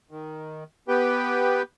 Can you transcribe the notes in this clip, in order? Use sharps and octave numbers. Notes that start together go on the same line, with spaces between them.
D#3
B3 G4 B4 G5